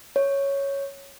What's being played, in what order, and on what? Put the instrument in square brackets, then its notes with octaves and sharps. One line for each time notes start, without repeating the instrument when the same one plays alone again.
[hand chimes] C#5